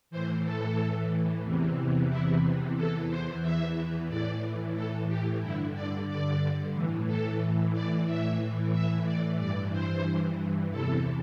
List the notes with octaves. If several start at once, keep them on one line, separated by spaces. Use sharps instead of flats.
A2 E3 C5
A4
E2 C3 E3
E4
E2 E3 A4
C5
E5
A2 E3 D5
A4
G4
G2 D3 E4
D5
D5
A2 E3
A4
D5
A2 E3 E5
E5
D5
G2 E3 D5
C5
E2 C3 E3 A4